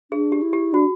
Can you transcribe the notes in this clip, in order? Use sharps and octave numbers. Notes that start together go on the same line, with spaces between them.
D4 G#4
G4
E4
G4
D4 F#4